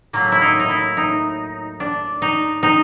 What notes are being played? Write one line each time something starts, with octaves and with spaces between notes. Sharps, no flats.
A2 F#3 A3 A#3
E4
D#4
D#4
E4
D#4
D4
D#4
D#4